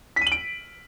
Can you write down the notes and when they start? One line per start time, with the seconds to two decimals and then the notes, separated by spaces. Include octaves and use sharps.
0.16 B6
0.21 D#7
0.27 F#7
0.32 D7